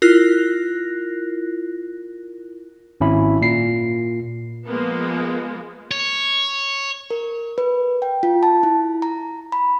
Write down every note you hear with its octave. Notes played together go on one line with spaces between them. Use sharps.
E4 F4 A#4 F#6 A#6
G#1 C#4 E4 B5
A#2 C7
F3 G#3 A#3 B3
C#5
A#4
B4
G5
F4
A5
E4
A#5
B5